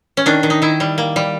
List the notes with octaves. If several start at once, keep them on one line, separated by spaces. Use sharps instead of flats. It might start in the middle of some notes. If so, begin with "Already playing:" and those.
C#4
D#3 D4
D#3
D#4
D#3 E4
G3
A#3
G3